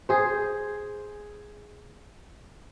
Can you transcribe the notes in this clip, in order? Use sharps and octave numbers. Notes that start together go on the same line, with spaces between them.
G#4 C5